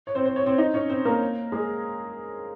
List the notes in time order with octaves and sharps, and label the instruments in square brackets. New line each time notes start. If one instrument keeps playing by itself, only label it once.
[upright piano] C#5
C4 C5
C5
C#5
C4 C5
D#4 D#5
C#4 C#5
C4 C5
A#3 A#4
G#3 G#4